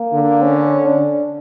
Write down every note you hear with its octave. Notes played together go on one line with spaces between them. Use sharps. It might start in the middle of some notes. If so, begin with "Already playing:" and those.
Already playing: A#3
D3
C#4
D4